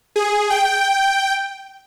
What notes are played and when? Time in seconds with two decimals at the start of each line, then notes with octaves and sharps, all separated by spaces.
0.16 G#4
0.50 G5